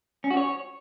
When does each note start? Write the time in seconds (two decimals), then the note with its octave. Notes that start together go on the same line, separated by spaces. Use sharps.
0.24 C#4
0.31 F#4
0.37 C#5